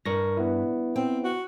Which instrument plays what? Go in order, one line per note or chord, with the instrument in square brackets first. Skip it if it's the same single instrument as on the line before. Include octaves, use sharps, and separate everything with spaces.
[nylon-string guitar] G2 [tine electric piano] A#4 C#6 A#6
[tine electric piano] B3 E4
[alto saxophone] C4 [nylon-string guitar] G5
[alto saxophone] F#4